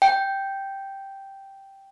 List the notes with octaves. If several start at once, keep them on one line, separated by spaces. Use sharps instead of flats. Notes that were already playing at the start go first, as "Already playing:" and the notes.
G5